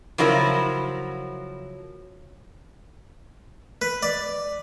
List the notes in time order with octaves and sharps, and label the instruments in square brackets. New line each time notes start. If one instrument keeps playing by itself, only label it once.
[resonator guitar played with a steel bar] C#3 F3 F#3 E4 A#4
[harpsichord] B4
D5